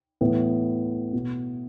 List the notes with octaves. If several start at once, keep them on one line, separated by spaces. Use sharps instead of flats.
A2 E3 B3
B2